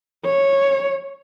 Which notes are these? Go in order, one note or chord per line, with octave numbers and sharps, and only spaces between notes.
C#5